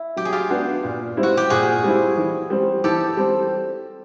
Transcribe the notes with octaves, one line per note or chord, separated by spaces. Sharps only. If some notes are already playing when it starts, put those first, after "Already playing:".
Already playing: E4
F#3 G4
G#4
F4 G4
B3 D4 F#4
A#2
G3 C4 E4
F#4
G4
A#2 F#4 G#4
G3 C4 E4
E3
G3 C4
E3 G4 A4
G3 C4